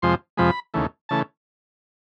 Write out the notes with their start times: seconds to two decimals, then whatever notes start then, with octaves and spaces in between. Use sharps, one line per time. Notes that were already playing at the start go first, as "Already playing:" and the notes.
0.02 F2 C3 F3 G#3 C6
0.37 F2 C3 F3 G#3 B5
0.74 D#2 C#3 E3 A3
1.09 C#3 E3 A3 A5